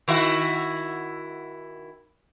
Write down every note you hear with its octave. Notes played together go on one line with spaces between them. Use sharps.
D#3 E4 F#4